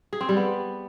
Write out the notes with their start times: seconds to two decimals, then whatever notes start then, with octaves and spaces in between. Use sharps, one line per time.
0.13 G#4
0.21 C4
0.29 G3
0.37 B3